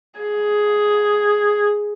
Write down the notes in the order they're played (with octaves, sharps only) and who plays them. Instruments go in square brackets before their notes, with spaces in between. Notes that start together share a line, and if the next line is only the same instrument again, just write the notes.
[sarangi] G#4